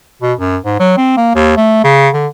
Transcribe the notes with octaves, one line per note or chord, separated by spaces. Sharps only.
B2
F#2
G#2
F#3
C4
A#3
D#2
A3
C#3
D3